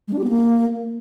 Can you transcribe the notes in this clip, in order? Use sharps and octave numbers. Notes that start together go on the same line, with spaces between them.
G#3
D4
G4
B3
A#3